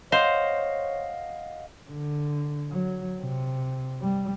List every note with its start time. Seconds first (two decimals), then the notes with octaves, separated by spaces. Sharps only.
0.12 C5 C#5 D#5 F5 F#5
1.89 D3
2.71 F#3
3.20 C3
4.01 G3